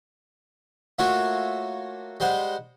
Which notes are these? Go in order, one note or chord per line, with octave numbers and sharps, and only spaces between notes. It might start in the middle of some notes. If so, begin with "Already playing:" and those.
A3 A#3 F4 F#4 C#5 E5
G3 G#3 C5 F#5